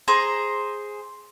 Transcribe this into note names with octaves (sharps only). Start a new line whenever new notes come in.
G#4 C5 A#5